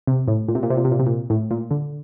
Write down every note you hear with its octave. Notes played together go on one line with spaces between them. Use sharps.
C3
A2
A#2
C3
A#2
C3
A#2
C3
A#2
C3
A#2
A2
A#2
D3